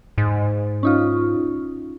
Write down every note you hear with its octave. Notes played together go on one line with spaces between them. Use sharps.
G#2
C#4 D#4 F4